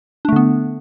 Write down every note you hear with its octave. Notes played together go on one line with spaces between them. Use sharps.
D3 A3 B3 D4